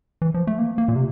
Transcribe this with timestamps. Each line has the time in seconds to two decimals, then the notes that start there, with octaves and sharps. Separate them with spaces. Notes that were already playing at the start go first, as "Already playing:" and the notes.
0.22 E3
0.34 F3
0.47 A3
0.59 A#3
0.78 A#3
0.88 A#2
0.96 C3